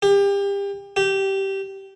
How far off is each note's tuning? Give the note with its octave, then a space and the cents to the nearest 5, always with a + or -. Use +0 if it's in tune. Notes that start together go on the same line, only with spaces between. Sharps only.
G4 +30
G4 -15